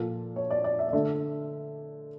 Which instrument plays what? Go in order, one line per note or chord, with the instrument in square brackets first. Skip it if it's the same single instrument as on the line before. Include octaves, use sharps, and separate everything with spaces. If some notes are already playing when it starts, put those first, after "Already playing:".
Already playing: [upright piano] A#2 F3 A#3 A4
C#5
D5
D5
E5
D5
D3 A3 E5